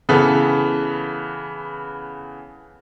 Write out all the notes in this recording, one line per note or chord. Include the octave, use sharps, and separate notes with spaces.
C#3 E3 B3 A4 B4